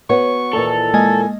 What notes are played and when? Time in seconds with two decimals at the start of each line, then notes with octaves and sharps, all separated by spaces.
0.09 B3 F#4 C#5 C#6
0.53 D#2 A#2 E3 A4 F7
0.94 G#3 A#3 D#5 G#5